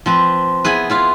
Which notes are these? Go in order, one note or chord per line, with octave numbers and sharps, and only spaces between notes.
F3 C4 B4
B3 E4 G#4 B4
E4 F4 F5